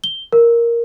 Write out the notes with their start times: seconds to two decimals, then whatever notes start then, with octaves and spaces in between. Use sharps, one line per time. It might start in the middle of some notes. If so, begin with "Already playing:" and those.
0.04 G7
0.33 A#4